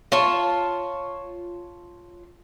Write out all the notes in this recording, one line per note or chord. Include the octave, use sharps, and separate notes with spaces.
F4 C#5 A5